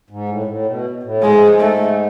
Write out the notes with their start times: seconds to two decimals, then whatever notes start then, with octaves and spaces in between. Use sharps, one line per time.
0.10 G#2
0.29 A2
0.47 A2
0.66 B2
1.03 A2
1.22 G#2 G#3
1.60 A3